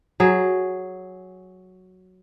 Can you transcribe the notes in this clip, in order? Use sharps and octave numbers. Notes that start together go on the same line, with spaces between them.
F#3 G#4